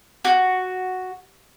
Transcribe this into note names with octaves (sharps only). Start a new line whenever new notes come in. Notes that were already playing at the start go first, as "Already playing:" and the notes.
F#4